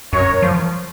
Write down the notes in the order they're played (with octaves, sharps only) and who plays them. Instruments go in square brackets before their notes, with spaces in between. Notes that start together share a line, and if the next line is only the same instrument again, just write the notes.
[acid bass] F#2 [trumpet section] A#4 C#5
[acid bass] F3